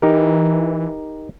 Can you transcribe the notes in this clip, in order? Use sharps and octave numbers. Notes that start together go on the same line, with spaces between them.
E3 D#4 G4 A#4